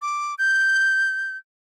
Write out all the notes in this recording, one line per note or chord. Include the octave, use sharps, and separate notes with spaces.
D6
G6